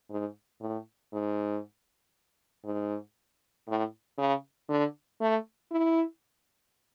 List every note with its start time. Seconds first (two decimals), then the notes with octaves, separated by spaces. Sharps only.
0.10 G#2
0.61 A2
1.13 G#2
2.65 G#2
3.68 A2
4.18 C#3
4.69 D3
5.21 A3
5.71 E4